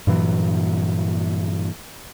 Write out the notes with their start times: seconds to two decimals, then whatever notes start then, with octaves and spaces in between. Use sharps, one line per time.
0.07 G2 A#2 E3 F#3